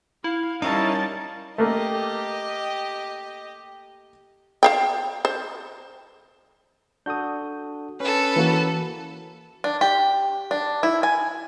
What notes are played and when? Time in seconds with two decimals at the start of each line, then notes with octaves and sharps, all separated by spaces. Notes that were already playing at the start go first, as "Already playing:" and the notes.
0.24 E4 F5
0.62 G3 C#4 D#4 E4 A#4 C#5 F5 A5
1.58 A3 A#3 G4 D#5
4.63 C5 F5 G5
5.25 C5
7.06 D4 F#4 A4 D#6 G6
8.00 C#4 A4 B4
8.36 E3 A#3 F#4
9.64 D4
9.81 G4
10.51 D4
10.83 E4
11.03 G#5